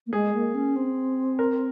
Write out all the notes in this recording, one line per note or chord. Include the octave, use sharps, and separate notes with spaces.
A#3
G#3 G#4
A#3
C#4
C4
A#4